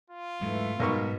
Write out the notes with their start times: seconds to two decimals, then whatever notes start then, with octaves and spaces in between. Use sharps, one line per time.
0.10 F4
0.41 G#2 E3 F#3 G#3 A3
0.80 B1 G#2 B2 G3 B3 A#4 C#6